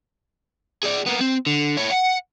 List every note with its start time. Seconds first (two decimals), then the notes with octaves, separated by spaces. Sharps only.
0.83 G#4 D5
1.06 A#3 B3
1.21 C4
1.46 D3
1.78 E4 C#5
1.92 F#5